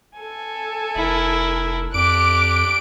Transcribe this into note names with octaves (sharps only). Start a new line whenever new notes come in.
A4 G#5
F1 E4 A#4
F2 D4 G4 D6 F#6 D7